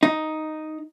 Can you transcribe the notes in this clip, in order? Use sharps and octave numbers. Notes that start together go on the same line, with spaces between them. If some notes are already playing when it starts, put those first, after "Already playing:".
D#4